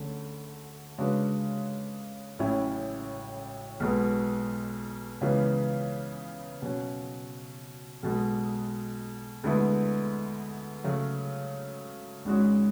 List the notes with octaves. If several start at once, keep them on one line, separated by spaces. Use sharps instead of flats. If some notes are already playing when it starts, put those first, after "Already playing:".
Already playing: D2 D3 A3 C#4
C#3 G#3 D4 F#4 B4
A1 A2 F#3 C#4 E4
B1 B2 G#3 B3
C#2 C#3 E3 B3
B2 F#3 C#4 F#4
B1 B2 G#3
D2 D3 G#3 B3 E4
C#3 F#3 A3
G#1 G#2 G#3 C#4 F#4